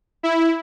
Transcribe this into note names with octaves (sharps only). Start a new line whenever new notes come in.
E4